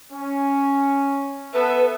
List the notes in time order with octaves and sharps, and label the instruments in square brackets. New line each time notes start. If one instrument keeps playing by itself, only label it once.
[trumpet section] C#4
[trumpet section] B3 A4 E5 [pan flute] B4